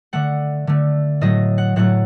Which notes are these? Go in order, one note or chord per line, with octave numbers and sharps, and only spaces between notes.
D3 A3 F#5
D3 A3
A2 F#3 A3 D#5
F#5
A2 F#3 A3 F#5